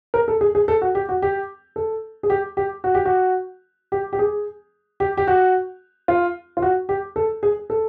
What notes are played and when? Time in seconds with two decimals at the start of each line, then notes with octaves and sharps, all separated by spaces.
0.14 A#4
0.28 A4
0.41 G#4
0.55 G#4
0.68 A4
0.82 F#4
0.95 G4
1.09 F#4
1.22 G4
1.76 A4
2.23 G#4
2.30 G4
2.57 G4
2.84 F#4
2.95 G4
3.05 F#4
3.92 G4
4.13 G4
4.19 G#4
5.00 G4
5.17 G4
5.27 F#4
6.08 F4
6.57 F4
6.62 F#4
6.89 G4
7.16 A4
7.43 G#4
7.70 A4